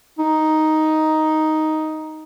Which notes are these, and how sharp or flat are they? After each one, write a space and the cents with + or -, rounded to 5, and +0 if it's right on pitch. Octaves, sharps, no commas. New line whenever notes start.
D#4 +5